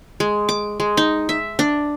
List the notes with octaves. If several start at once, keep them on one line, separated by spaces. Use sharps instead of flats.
G#3
D6
G#3
D#4
E5
D4